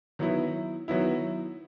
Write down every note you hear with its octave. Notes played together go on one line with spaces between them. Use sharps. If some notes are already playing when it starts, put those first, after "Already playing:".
D#3 F#3 B3 E4
D#3 F#3 B3 E4